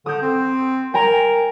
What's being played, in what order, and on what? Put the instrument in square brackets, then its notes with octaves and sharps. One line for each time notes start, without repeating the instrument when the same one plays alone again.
[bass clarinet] D3 [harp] D#6 G6
[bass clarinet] C4
[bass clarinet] A#4 [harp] G5 G#5 A#5